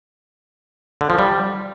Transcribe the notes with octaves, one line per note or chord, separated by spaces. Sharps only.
D3
F3
G3